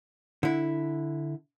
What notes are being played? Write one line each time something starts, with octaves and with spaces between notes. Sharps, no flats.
D3 E4